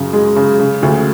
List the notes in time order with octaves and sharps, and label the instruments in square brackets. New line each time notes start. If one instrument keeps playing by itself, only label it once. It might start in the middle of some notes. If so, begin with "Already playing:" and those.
Already playing: [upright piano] F#2 C#3
G#3
C#3
C#3
D2